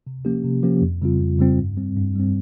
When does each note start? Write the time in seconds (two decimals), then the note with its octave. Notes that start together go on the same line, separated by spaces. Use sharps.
0.07 C3
0.25 F3 A#3 C#4 G4
0.44 C3
0.63 F3 A#3 C#4 G4
0.82 F2
1.02 C#3 G3 C4 F4
1.20 F2
1.39 C#3 G3 C4 F4
1.58 G2
1.77 G3 C4
1.96 G2
2.15 G3 C4